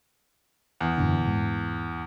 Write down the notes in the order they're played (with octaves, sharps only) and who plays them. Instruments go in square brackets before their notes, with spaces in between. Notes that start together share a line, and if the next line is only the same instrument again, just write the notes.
[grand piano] E2
[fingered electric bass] F#2 A#2 D3
G#2